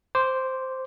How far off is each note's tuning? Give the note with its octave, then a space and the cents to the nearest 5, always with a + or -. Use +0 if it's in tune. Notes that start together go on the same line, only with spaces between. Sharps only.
C5 +0 D6 -15